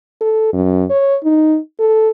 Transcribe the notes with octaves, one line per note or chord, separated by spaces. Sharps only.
A4
F#2
C#5
D#4
A4